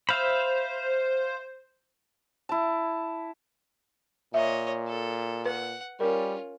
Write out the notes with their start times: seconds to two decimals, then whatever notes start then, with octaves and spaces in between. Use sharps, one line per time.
0.09 C5 E5 F5 B5
2.49 E4 A5
4.34 A#2 C#5 D#5 E5
4.88 A4
5.46 B4 F#5
6.00 G3 C#4 F4 A#4